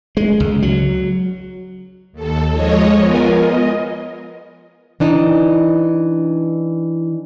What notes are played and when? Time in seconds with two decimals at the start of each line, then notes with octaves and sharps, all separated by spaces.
0.17 G#3
0.40 C#2
0.62 F#3
2.13 D#2 A4
2.52 F3 G#3 C#5 D#5
2.99 B3 F4 A#4 G#5
3.31 D#5
5.00 E3 D4 D#4